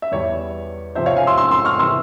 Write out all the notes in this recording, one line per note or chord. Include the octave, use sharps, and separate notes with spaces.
E5
E2 E3 G3 C#5
F2 C3 F3 C5 E5
C#5 F5
F5 G#5
C6 E6
C6 E6
C6 E6
C#6 F6
C3 E3 C6 E6